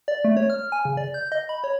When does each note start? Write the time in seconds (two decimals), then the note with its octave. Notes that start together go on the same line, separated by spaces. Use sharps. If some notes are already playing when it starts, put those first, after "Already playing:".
0.08 D5
0.25 A3
0.37 C#5
0.50 F6
0.72 G#5
0.85 C#3
0.97 D5
1.14 G6
1.32 D#5
1.49 B5
1.64 C#5